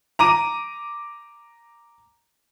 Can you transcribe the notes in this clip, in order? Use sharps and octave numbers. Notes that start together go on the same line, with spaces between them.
A#5 D6 D#7